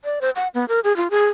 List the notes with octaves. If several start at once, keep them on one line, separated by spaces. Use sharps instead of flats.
D5
C5
F#5
B3
A#4
G#4
F4
G#4